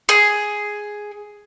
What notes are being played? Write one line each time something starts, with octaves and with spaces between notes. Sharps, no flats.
G#4